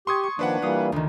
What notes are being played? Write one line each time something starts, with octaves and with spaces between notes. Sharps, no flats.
G4 C6 C#6 D#6 G#6
C#6
D#3 F3 A#3 D4 B4 F#5
E3 G3 A#3 F4 D#6
D2 D#3